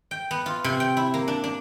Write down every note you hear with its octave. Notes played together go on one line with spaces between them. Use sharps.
G5
B3
F4
C3
G5
E4
A#3
D4
D4